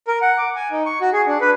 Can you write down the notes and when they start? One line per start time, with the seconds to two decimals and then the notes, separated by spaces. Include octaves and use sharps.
0.08 A#4
0.22 F#5
0.38 D6
0.56 G#5
0.71 D#4
0.86 C#6
1.01 F#4
1.13 G#4
1.27 D4
1.41 B4